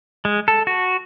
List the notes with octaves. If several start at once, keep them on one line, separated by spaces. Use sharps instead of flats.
G#3
A4
F#4